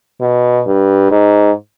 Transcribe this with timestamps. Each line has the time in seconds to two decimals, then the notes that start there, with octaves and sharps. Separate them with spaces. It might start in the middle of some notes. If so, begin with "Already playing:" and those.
0.21 B2
0.67 G2
1.11 G#2